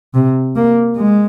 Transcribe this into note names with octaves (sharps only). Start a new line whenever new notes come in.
C3
A#3
G#3